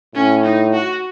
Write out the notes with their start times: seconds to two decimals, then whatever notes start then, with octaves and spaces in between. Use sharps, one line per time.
0.15 A2 C#4
0.44 D#4
0.73 F#4